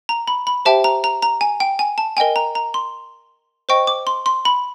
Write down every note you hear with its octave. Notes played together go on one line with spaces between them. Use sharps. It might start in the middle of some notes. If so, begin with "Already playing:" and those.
A#5
B5
B5
G4 C5 E5 G5 A5
A#5
A#5
A#5
G#5
G5
G#5
A5
A#4 D#5 G5 G#5
A#5
A#5
C6
C5 D#5 G5 C#6
D6
C6
C6
B5